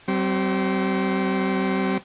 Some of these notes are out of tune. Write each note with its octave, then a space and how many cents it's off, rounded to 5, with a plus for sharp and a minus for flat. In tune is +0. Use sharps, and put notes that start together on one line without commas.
G3 -40 C4 +0